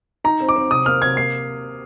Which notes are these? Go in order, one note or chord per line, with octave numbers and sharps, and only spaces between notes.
D#4 A#5
C4
D6
C4
C3 D#6
A#3 F6
C3 G#6
A#3 C7